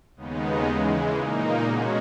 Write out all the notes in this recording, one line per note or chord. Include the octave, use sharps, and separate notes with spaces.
D#2 C#3 G#3 B3 D#4
C#3 E3 G#3
A#2 A#3 D#4
B2 G#3 C#4 F#4